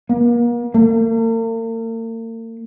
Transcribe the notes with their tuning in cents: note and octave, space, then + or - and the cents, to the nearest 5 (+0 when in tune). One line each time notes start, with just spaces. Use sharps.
A#3 +40
A#3 -45